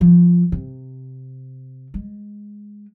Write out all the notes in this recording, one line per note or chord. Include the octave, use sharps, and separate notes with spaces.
F3
C3
G#3